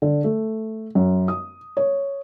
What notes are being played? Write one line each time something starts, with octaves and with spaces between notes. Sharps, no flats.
D3
A3
F#2
D#6
C#5